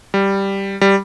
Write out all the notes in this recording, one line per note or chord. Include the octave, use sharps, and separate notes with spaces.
G3
G3